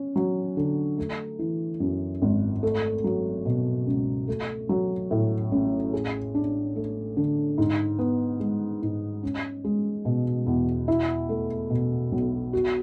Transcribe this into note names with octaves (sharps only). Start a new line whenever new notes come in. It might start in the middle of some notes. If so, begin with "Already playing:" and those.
Already playing: C#4
F#3
D3
A3
E3
F#2
G#1
A3
F#3
B2
C#2
A3
F#3
A2
A1
G#4
D4
A3
D3
G#2
B3
G#3
G#2
C#4
G#3
B2
E2
E4
A3
B2
B1
F#4